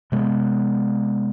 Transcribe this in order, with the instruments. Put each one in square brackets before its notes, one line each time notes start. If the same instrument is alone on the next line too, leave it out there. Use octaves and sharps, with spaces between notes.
[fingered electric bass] C3 G#3 B3